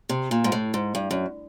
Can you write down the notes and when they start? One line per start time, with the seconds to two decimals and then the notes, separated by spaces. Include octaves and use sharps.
0.09 C3
0.31 A#2
0.44 G#2
0.52 A2
0.74 G#2
0.95 G2
1.11 F#2